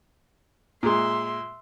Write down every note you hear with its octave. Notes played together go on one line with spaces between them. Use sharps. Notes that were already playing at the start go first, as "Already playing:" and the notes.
A#2 G#3 E5 C6